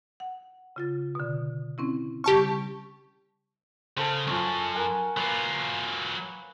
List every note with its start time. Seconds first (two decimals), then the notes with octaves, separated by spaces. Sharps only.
0.20 F#5
0.76 C#3 F4 A6
1.15 B2 D3
1.78 C4 C#4 E4
2.24 C#3 G3 G4 A5 C#6
3.97 C#3 A4 C5
4.27 C#2 F#2 C#4 F4
4.75 A#4 F#5 G#5
5.17 F#3 A#3 F4 B4